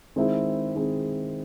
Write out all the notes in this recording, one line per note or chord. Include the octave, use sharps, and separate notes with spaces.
D#3 G#3 C4 E4 G#4
D#3 G#3 C4 E4 G#4